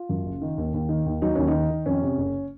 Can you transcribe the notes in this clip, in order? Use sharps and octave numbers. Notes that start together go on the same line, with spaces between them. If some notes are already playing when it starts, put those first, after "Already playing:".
Already playing: F4
F#2
F#1
D#3
D#2
D#2
D#3
D#2
F#3 D#4
D#2 C#4
D#4
D#3
D#3
F2 C#4
C3
F#1